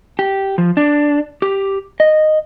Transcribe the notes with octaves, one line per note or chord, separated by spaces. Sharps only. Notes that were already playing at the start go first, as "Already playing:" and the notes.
G4
F3
D4
G4
D#5